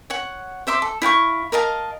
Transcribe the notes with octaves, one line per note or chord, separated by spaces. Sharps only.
C#5 F#5
C5 E5 C6 D6
A4
E4 F5 G5 C#6
A#4 D#5 F5 A5